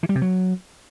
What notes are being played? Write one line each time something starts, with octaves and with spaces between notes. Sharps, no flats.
E3
G3
C3
F#3